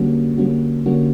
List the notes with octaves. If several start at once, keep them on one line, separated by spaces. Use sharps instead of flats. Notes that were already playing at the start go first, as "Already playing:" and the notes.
Already playing: D3 G3 A#3 C#4 F#4
D3 G3 A#3 C#4 F#4
D3 G3 A#3 C#4 F#4